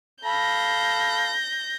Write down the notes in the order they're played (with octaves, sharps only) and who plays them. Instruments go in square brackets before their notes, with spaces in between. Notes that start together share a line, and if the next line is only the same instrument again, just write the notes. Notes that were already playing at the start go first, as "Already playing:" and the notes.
[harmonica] A4 F5 B5 [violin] G6 A#6